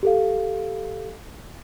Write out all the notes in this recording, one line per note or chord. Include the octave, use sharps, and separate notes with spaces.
G4 A4 F5